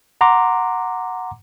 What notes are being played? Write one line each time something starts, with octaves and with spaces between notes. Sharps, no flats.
F#5 A#5 C6 D6